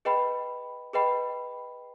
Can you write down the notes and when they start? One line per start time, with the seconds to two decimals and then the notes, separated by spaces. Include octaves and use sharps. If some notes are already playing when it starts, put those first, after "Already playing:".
0.05 G#4 B4 D#5 G5 B5
0.93 G#4 B4 D#5 G5 B5